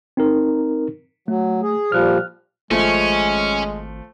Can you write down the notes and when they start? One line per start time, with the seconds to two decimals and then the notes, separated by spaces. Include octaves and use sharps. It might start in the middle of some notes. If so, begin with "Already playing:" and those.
0.17 C4 D#4 A#4
1.28 F#3 A3
1.63 G#4
1.92 A#2 F3 G3 F6 F#6
2.71 G#1 F3 G#3 A3 C#4